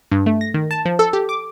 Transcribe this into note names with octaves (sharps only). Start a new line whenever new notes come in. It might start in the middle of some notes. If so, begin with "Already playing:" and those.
G2
A3
A#6
D#3
A5
F3
A4
G4
D6